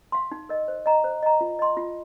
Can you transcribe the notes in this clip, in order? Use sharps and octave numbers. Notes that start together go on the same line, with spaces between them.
F5 C6
D#4
A#4 D#5
C5
D#5 A#5
C5
D#5 A#5
F4
D#5 C6
F4